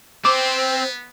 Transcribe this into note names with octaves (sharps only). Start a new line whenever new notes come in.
B3 C4 C5 D6